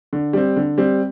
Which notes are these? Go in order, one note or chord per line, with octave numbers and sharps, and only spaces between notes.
D3
G3 C4
D3
G3 C4